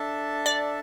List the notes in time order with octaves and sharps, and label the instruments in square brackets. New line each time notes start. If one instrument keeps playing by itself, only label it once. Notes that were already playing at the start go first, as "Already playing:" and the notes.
Already playing: [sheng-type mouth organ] D4 A4 E5 A5
[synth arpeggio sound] D5